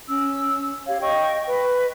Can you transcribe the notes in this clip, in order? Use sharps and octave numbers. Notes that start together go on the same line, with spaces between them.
C#4 E6
G4 C#5 F5
D#5 G5 C#6
B4